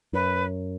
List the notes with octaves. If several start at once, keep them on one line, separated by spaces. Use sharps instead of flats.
F#2 B4